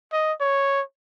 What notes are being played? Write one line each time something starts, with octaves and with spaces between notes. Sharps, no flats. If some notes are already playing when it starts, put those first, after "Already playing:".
D#5
C#5